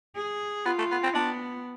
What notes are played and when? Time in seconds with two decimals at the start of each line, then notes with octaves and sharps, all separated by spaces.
0.17 G#4
0.66 B3 F4
0.78 A3
0.91 B3
1.03 C4
1.15 B3 D4